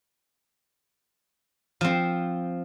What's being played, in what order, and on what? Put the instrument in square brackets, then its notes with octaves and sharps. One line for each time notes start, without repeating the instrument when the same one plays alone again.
[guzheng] F3 C4